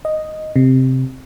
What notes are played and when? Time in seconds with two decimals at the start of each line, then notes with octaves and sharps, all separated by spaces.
0.05 D#5
0.56 C3